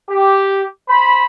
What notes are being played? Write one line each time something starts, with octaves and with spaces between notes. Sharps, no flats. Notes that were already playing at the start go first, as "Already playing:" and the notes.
G4
C5 B5